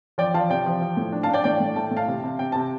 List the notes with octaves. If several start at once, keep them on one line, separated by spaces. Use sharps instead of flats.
F3 D5 G5
F3 F5 A5
C3 D5 G5
F3
F3
A2
D4
F5 A5
D4 D5 G5
A2 D5 G5
A2
A3 A5
A2
F5 A5
C3
C3
C3 G5
C3 A5